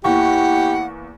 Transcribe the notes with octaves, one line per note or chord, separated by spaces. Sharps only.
E2 A#3 E4 G4 F#5 C#6